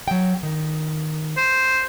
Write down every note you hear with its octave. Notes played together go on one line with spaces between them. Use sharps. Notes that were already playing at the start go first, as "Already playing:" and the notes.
F#3 G5
D#3
C5